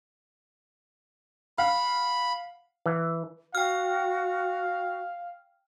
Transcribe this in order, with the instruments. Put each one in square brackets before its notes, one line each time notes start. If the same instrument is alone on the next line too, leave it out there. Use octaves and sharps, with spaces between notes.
[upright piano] F5 F#5 [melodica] B5
[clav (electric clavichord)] E3
[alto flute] F#4 [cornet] F5 [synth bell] G5 F6